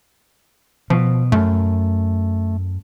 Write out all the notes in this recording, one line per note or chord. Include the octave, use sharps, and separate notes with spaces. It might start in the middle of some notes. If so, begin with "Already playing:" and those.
B2 F3
F#2 A3